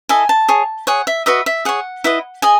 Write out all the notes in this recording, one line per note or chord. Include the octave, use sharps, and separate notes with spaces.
E4 A4 D#5 G#5
A5
G#4 C#5
G#4 C#5 F#5
E5
F#4 B4 D#5 E5
E5
G#4 C#5 F#5
E4 B4 D#5
G#4 D#5 G#5